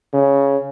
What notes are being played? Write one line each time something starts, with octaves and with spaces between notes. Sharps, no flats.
C#3